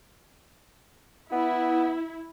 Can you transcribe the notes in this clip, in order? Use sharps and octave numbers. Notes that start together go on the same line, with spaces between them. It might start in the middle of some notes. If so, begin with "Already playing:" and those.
B3 E4